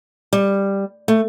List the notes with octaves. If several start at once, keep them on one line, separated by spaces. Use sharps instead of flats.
G3
A3